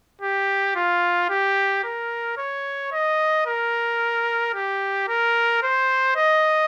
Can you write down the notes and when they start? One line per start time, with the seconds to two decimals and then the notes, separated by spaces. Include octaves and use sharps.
0.22 G4
0.75 F4
1.30 G4
1.84 A#4
2.38 C#5
2.93 D#5
3.47 A#4
4.55 G4
5.08 A#4
5.63 C5
6.17 D#5